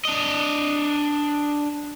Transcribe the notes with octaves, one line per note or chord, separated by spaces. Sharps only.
D4 D#5